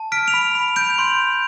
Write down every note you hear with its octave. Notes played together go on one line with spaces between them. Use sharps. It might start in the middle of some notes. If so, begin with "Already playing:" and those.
Already playing: A5
F6 B6 D7
D7 F7
B5
B5
G6 D7 F7
C6